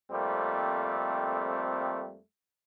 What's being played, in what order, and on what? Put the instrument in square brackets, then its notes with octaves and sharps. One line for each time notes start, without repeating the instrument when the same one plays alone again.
[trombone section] F2 G3 A3 A#3 C4